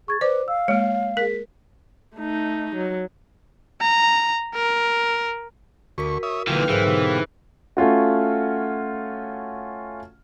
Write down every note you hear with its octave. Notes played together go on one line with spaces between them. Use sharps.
G#4 C#6 G#6 A6
B4 C5 D5 D6
F5 E6
G#3 A#3 C#5
G#4 A#4 B6
A3 D#4
F#3
A#5
A#4
D2 F#4 A#4 C#6 B6
C#5 E5 D#6
B1 A#2 D3 E3 F5 G5 F6
G#2 E3 C4 G#4 A#4 C5
B2 G4 F5
A3 C#4 F4 F#4